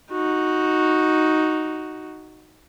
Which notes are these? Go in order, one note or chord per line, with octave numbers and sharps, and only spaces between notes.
D#4 F#4